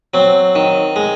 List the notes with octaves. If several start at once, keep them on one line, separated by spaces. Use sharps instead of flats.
F#3 C4
D#3
G#3